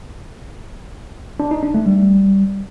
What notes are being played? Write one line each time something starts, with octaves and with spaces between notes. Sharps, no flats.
D4
D#4
D4
A3
G3